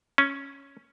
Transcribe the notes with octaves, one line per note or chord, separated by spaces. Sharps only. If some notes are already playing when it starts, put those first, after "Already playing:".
C#4